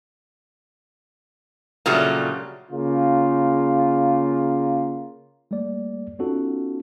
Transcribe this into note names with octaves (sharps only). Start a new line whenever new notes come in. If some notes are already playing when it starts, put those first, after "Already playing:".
A#2 C#3 F#3 G3 A3
C#3 A#3 F4
G3 A3 A#3 D5
B3 C#4 D#4 F4 F#4 A4